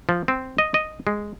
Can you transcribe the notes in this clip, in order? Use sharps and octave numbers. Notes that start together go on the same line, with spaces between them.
F3
C4
D#5
D#5
G#3